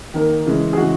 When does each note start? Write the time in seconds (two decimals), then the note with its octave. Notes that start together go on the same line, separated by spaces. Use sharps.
0.14 D#3 A#3
0.46 C#3 E3 G#3
0.73 G#4
0.77 C#3 E3 G#3 F#4